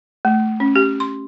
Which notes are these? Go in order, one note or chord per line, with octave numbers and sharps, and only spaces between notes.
A3
C#4
G4
C6